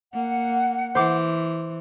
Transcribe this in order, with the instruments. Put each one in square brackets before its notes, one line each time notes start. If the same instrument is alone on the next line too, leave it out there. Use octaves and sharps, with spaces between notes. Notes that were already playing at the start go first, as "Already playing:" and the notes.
[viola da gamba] A#3 [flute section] F#5
[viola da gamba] E3 [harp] C5 D6